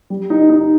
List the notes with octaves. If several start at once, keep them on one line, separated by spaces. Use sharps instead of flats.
G3
D#4
D#4